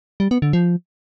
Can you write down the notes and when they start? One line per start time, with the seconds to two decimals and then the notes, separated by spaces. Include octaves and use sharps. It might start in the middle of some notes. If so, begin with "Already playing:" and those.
0.20 G3
0.31 B3
0.42 D3
0.53 F3